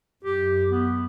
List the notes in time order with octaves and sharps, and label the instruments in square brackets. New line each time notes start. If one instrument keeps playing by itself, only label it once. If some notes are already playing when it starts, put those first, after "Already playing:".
[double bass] F#2 [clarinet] G4
[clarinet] B3